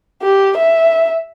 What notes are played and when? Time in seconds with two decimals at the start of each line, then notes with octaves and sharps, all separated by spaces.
0.23 G4
0.57 E5